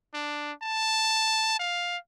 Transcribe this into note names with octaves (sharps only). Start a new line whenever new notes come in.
D4
A5
F5